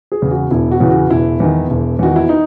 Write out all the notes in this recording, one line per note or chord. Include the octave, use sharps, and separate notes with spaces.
G#4
E2 C#3 E3
F#4
E1 E4
F#4
E2 C#3 E3
F#4
E1 E4
E2 D#3
E1
E2 D#3 F#4
E4
D#4